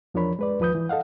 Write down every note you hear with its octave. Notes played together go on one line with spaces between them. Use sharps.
E2 F3 D4 A#4 C#5 B5
G#3 B4 D5
D#2 F3 B4 D#6 G6
E3
A4 D#5 F5 F#5